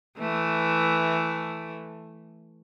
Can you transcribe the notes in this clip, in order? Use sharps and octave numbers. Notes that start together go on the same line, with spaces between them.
E3 A3